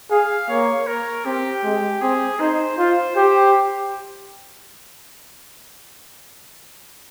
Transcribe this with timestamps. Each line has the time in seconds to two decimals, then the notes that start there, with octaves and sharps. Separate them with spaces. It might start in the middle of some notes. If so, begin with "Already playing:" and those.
0.10 G#4 F5
0.50 A#3 C#5
0.87 A#4
1.25 C4 G4
1.63 G#3
2.01 C4 G#4
2.39 D#4 C5
2.77 F4 C5
3.15 G4 C5